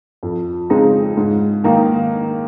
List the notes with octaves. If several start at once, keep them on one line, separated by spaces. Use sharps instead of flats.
F2
C#3 G#3 C4 D#4
G#2
D#3 A#3 D#4